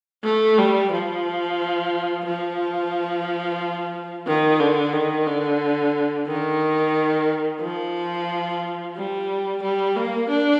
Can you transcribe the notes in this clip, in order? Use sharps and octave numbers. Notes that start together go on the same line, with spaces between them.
A3
G3
F3
F3
D#3
D3
D#3
D3
D#3
F3
G3
G3
A#3
D4